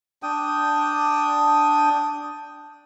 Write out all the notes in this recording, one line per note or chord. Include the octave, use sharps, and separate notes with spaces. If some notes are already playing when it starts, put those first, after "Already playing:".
D4 G5 D#6